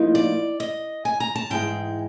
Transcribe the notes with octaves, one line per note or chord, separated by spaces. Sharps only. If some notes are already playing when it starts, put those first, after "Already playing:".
Already playing: A2 F3 A#3 D#4
D5
D#5
G#5
A#5
A5
G#2 E3 G#3 G5